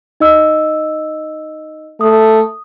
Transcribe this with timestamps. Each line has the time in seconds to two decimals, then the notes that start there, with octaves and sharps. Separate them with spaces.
0.20 D#4 D#5 E6
2.01 A3 D#6